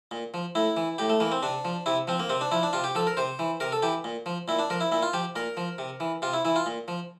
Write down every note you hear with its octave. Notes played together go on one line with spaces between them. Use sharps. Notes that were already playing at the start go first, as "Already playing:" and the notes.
A#2
F3
A2 E4
E3
A2 G4
A3
E3 A#3
C4
C3 D4
F3
C3 E4
F3 C4
A#3
C3 C4
D4
F3 E4
D4
C3 F4
G4
F3 A4
A#4
C3 C5
E3
C3 A#4
A4
E3 G4
A#2
F3
A#2 E4
D4
F3 A#4
E4
A#2 E4
F4
F3 G4
A#2 A#4
F3
C3
E3
C3 F4
E4
E3 E4
F4
A#2
F3